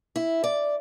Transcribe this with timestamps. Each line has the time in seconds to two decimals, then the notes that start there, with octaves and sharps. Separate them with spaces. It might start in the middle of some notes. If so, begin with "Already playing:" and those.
0.16 E4
0.44 D5